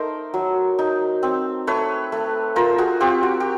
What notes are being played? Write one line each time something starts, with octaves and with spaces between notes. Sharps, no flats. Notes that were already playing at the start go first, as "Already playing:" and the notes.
Already playing: A3 D#4 A#4 C5
F#3
D#4
C4
A3 B4 C#5
A3
F4 A#4 C5
F#4 G#4
C4 F4 G4
F#4
G4